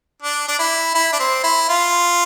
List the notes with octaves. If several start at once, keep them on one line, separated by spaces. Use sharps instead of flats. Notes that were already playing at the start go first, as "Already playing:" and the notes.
D4
D4
E4
E4
D4
C4
E4
F4